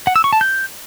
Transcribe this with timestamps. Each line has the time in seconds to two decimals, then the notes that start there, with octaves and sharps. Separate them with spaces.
0.07 F#5
0.16 E6
0.24 C#6
0.33 A5
0.41 G6